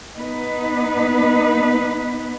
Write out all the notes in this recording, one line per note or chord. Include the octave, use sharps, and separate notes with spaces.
B3 D#4 B4